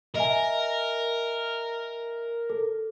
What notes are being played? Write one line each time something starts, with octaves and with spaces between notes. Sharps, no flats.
A#4 D#5 E5 G#5
A4